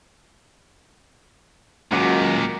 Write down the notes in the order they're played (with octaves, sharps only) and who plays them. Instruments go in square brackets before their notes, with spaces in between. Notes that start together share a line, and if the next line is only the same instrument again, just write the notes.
[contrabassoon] C#2 [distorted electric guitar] A#2 D#3 [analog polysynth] F#3 [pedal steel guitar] A#4 F#5 D6